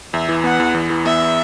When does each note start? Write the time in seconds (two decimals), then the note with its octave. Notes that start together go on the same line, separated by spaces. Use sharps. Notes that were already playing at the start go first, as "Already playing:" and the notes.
0.13 E2 E5
0.29 E3
0.44 B3 F#5
0.60 E2
0.74 E2
0.90 E3
1.05 B3 E5